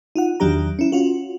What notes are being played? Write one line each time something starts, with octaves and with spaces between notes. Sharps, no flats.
D#4 F4 F#5
E2 D#3 F#3 D4 G4 A#5
C#4 E4
C#4 F4 F#4